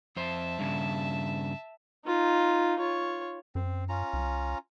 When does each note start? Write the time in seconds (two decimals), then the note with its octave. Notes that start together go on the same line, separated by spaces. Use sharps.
0.17 F2 C5 E5 A5
0.59 G2 C#3
2.06 D#4 F4
2.79 F4 C#5
3.55 F#2 C4
3.89 C#4 F4 A#5
4.13 C2